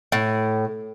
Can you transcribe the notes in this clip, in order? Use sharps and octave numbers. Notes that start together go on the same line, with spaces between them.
A2